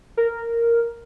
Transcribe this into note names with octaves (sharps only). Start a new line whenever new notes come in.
A#4